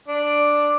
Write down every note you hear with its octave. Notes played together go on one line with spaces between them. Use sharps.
D4